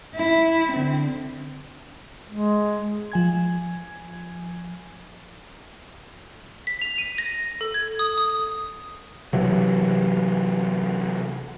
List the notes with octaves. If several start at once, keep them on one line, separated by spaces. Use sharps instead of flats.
E4
D3 C4
G#3
F3 G#5 G#6
B6
F7
D#7
A#6
A4
G#6
D#6
D#6
C3 E3 F#3